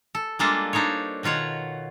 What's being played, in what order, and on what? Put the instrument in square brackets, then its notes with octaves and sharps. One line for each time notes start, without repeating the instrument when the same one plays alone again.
[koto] A4
G3 G#3 A#3 D4 F4 A4
D4 D#4 C5 C#5
B2 D#3 F4 C#5 F#5